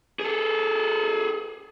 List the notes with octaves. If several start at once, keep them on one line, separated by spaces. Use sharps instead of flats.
G#4 A4